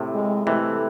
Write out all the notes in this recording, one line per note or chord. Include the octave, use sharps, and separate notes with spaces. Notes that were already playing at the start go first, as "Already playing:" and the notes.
Already playing: A2 C3
G#3
C3 E3 A3